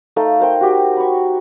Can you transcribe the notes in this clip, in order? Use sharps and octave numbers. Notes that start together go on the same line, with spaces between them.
A3 D#4 A4 F5
A#4 C5 G5
F#4 G4
B5 C#6